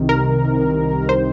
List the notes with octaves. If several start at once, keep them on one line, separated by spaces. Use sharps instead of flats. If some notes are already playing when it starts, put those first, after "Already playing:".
Already playing: C2 C3 D#3
A#4
C5